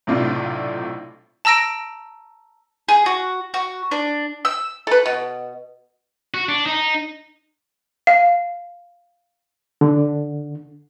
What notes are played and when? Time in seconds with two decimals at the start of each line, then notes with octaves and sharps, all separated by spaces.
0.07 B1 A2 C3 D4 F4
1.45 A5 A#5 E6 A#6 D7
2.89 G#4
3.06 F#4
3.54 F#4
3.91 D4
4.45 E6
4.87 A4 B4
5.06 B2
6.34 F#4
6.49 D4
6.66 D#4
8.07 F5
9.81 D3